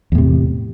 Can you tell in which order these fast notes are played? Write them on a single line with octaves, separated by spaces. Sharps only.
E2 A2 C3